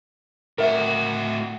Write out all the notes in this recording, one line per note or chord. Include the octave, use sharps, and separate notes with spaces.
A2 F#4 A#4 E5